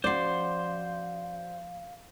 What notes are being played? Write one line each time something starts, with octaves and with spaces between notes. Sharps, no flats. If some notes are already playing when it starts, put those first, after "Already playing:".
F3 C#4 F#4 C5 D5 F5 C6